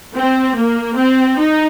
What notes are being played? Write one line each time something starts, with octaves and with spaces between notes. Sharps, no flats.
C4
A#3
C4
D#4